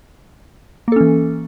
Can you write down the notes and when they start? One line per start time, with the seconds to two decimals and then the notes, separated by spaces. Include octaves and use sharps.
0.88 A#3
0.92 A4
0.96 C#4
1.01 E3